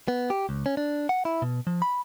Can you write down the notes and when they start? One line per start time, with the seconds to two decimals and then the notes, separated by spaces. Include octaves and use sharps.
0.08 B3
0.30 G4
0.49 C#2
0.66 C#4
0.77 D4
1.09 F#5
1.25 E4
1.42 B2
1.67 F3
1.82 B5